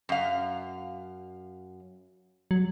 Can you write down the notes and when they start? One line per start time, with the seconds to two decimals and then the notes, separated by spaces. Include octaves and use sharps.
0.09 F#2 F5
2.51 F#3